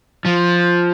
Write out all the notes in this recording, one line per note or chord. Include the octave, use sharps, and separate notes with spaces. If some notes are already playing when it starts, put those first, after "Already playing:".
F3